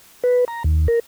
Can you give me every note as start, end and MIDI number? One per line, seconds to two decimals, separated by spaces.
0.24 0.45 71
0.48 0.63 82
0.64 0.87 39
0.88 0.99 70